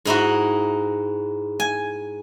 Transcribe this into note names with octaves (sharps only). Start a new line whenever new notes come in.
G#2 D#4 E4 F#4
G#5